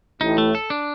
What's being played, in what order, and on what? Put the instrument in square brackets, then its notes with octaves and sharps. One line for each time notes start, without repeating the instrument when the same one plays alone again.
[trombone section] A1 A2 [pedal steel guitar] D#4
[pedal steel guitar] A3
A4
D4